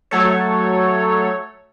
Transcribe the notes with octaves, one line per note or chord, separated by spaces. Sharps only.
F#3 A3 A4 C#5